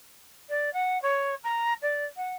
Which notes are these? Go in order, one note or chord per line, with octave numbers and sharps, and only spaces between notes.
D5
F#5
C#5
A#5
D5
F#5